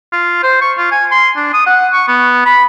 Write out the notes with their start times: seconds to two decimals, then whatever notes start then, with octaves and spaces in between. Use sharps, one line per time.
0.12 F4
0.43 C5
0.61 C#6
0.78 F4
0.92 G#5
1.12 C6
1.36 D4
1.54 D#6
1.66 F#5
1.93 C#6
2.08 B3
2.46 B5